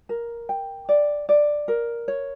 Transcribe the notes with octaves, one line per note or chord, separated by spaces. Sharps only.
A#4
G5
D5
D5
A#4
C#5